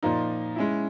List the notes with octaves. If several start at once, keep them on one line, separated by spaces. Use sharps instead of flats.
A#2 F3 A#3 D#4
G#3 C#4 E4